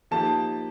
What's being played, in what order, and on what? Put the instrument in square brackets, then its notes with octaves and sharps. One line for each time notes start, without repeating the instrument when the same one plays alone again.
[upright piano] F3 A#3 D#4 G4 [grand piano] A5